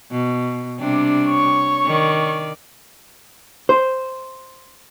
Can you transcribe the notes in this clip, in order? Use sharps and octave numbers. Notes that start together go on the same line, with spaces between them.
B2
C3 G3 D4
C#5 C#6
D#3 D5
C5